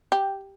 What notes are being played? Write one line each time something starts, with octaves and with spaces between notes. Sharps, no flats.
G4